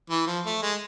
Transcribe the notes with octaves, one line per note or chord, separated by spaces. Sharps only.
E3
F3
A3
G#3